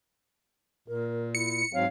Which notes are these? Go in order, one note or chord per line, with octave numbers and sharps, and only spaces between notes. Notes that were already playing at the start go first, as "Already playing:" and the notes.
A#2 A#4
E4 C#7
G#2 F#3 C4 C#5 F5